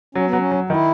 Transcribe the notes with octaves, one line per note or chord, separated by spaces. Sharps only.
F#3 C#4
B3
F#3 C#4
F#3
D#3 E4